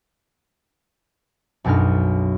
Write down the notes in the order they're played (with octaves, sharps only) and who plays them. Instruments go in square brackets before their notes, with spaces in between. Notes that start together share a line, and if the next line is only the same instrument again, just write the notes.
[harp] B1 F#2 B2 D4 D#4 F6